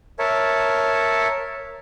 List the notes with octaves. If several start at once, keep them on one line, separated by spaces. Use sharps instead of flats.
A#4 C#5 E5 A5